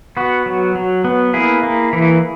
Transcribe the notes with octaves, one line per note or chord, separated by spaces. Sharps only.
B3 F#4
F#3
F#3
B3
A#3 E4 G#4
A#3
E3